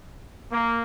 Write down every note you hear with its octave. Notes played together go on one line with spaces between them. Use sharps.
A#3